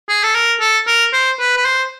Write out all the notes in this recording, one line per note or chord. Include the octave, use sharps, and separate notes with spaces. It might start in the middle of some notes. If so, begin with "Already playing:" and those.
G#4
A4
A#4
A4
A#4
C5
B4
B4
C5